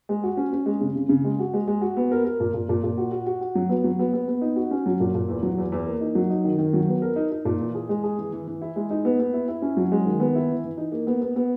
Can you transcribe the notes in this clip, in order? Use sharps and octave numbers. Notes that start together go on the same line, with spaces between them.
G#3
F#4
C#4
C#4
G#3
C#3
C#3
C#3
G#3
F#4
G#3
G#3
F#4
B3
A#4
A#4
A#2
A#2
A#2
A#2
F#4
F#4
F#4
F#4
F#3
B3
F#3
B3
B3
B3
D#4
F#4
C#4
F#3
A#2
A#2
E2
F#3
E2
E2
A#3
D#4
F#3
D#4
D#3
D#3
F#3
B3
A#4
D#4
D#4
A#2
E3
G#4
G#3
G#4
E3
E3
E3
E4
G#3
D#4
B3
B3
E4
E4
C#4
F#3
G#3
D#3
B3
E4
E3
E3
D#4
A#3
B3
B3
B3